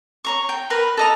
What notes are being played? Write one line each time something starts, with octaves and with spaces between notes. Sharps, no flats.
C#5 A#5 C#6
G5
A#4 B4 B5
A4 D#5 A#5